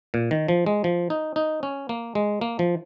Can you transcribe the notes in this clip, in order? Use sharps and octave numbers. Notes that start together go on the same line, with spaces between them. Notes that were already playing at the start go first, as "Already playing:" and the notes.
A#2
D#3
F3
G#3
F3
D#4
D#4
C#4
A#3
G#3
A#3
F3